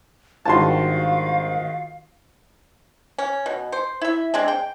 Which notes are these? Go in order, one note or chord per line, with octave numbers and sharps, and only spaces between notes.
G#1 G2 D#3 F4 F#4 F5 A5 C6
C#4
B2
C5
E4 E5
G#3 C4 D4
G5